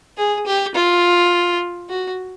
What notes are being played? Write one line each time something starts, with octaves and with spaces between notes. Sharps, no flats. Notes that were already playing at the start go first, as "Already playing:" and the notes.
G#4
G4
F4
F#4